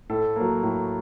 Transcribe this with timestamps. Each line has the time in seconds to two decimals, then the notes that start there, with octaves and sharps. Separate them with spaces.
0.10 A2 A4
0.36 F#3 A#3
0.63 A2